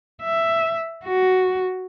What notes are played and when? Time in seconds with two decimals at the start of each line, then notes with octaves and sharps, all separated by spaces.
0.22 E5
1.05 F#4